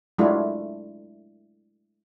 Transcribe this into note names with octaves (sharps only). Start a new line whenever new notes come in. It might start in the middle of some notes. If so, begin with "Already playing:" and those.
F#3 G#3 A3 D4 E4 F4